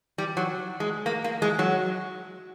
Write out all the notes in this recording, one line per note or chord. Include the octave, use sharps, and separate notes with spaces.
G3
F#3
G#3
A#3
A#3
G#3
F#3